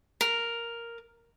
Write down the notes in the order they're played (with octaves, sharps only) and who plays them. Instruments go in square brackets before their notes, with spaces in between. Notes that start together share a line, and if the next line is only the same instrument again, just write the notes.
[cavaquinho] A#4